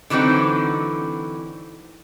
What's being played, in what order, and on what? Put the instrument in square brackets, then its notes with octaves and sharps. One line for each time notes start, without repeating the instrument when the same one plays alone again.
[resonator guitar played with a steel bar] D3 E3 F#3 C4 D#4